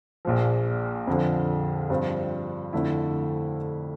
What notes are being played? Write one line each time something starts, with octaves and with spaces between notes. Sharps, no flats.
A#1 A#2 F3
F2 D3 F3
G2 F3 C4
F2 D3 A3 E4